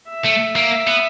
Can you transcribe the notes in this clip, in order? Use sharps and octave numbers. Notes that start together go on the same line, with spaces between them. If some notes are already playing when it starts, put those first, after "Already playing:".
E5
A3
A#3
B3